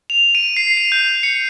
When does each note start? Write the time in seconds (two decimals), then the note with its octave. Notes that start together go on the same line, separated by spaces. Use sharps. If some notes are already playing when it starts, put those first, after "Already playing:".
0.10 F7
0.35 D#7
0.57 C7
0.77 D#7
0.92 G6
1.23 C#7